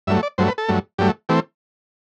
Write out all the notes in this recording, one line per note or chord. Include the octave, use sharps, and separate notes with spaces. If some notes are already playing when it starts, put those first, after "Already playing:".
G2 F#3 A3 E5
D5
G2 F#3 A3 C5
B4
A4
G2 F#3 A3
G2 F#3 A3 G4
E3 A3 C4 G4